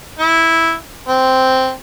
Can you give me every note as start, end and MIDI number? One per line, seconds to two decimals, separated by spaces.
0.19 0.73 64
1.08 1.71 60